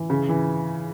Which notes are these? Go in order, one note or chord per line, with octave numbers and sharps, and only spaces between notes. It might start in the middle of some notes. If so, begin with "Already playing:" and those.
Already playing: E3
C#3
E3